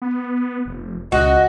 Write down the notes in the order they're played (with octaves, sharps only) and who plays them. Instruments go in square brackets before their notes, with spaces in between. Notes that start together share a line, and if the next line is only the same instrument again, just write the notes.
[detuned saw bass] B3
F1
[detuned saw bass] C#2 [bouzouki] F#4 [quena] D#5